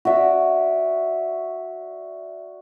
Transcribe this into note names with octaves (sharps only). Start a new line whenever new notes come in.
F#4 D5 E5